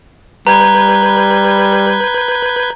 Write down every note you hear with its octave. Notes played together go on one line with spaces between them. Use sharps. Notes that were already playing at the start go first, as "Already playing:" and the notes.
G3 B4 A#5 G6 G#6